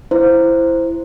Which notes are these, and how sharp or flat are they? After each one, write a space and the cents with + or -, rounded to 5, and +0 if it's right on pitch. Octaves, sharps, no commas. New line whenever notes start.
E4 +15 C5 +0